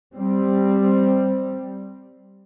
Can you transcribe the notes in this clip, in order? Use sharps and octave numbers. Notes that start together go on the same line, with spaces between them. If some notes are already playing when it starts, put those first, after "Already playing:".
G3 C4